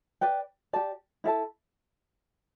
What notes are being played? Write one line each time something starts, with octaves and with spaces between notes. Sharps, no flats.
B4 D5 G5
G4 D5 A5
E4 A4 E5 A5